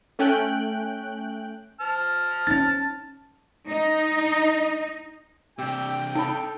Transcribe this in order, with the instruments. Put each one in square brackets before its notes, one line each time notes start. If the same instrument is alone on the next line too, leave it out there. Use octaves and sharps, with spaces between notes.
[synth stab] A3 C#4 G5 F#6
[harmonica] A5 F6
[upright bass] C#4 D#4 [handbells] A6
[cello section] D#4
[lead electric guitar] C3 D4 [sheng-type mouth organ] G4 E6 [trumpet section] G5
[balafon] D#4 B5 [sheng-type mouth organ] A4